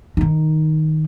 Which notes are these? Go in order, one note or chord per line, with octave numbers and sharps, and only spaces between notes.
D#3 D#4